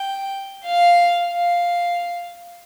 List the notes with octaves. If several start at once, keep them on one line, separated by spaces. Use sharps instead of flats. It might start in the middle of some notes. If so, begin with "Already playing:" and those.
Already playing: G5
F5
F5